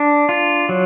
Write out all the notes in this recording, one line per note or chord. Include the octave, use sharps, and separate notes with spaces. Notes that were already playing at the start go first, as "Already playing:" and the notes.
Already playing: D4
F4
F#3